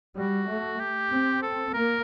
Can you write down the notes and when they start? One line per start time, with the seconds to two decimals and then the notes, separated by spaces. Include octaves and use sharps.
0.15 G3 F#4
0.47 A3
0.79 G4
1.10 C4
1.42 A4
1.73 A#3 A#4